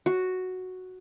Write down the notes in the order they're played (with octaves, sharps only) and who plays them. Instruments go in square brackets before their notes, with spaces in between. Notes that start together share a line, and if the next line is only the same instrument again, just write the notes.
[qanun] F#4